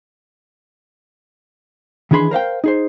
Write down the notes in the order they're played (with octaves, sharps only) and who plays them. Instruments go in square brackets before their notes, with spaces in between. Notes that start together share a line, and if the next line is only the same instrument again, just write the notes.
[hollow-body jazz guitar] D#3 E3 D4 G#4 B5 C6
A#4 C5 F5 G5
D#4 G#4 C5